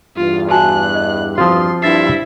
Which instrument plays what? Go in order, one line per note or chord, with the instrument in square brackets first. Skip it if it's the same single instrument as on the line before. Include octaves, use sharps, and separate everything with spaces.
[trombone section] E2 G2 [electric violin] F4
[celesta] F#4 G#5 A5 [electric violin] F#6
[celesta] D#5
[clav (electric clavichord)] F3 C4 F4 [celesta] F#4 D#6 [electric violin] C6
[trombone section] G2 [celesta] D4 A6 C7 [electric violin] E4 E5